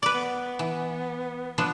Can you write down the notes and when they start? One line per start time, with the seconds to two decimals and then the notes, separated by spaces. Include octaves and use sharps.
0.03 B4 D5 D6
0.14 B3
0.59 E3
1.58 F3 B3 D4